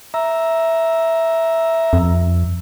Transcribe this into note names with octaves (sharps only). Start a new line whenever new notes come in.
E5 A#5
F2